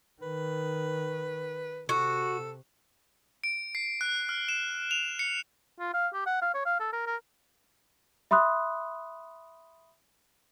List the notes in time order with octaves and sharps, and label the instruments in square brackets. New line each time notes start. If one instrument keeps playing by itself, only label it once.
[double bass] D#3 [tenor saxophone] B4
[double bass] C3 [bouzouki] F#4 [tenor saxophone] A4
[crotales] D7
C7
F#6
F6
E7
F7
C#7
[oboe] F4
F5
G4
F#5
F5
C#5
F5
A4
A#4
A#4
[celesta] E5 B5 C6 D#6 F#6